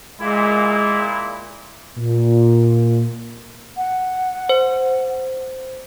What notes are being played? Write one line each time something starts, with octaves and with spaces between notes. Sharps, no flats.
A#2 G#3 E4
A#2
F#5
C5